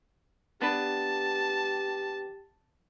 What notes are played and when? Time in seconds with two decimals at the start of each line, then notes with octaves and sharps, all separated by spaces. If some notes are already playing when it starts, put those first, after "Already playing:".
0.62 B3 D4 G4 B4 A5